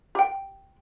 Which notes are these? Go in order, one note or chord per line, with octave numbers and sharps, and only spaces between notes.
G4 G5